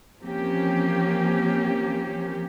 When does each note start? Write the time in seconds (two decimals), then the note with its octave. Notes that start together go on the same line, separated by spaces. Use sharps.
0.23 E3 F3 A#3 C4 C#4 G4